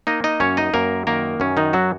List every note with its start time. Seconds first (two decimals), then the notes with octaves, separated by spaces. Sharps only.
0.07 A#3 D#4 D#5
0.24 D#4 D#5
0.40 F#2 C#4 C#5
0.57 D#4 D#5
0.74 F#2 A#3 A#4
1.07 D#3 A#3 A#4
1.40 F#2 C#4
1.57 D#3 D#4
1.73 F#3 F#4